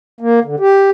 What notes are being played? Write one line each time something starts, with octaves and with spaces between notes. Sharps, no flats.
A#3
D3
G4